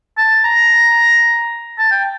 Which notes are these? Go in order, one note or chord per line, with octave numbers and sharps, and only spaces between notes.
A5
A#5
A5
G5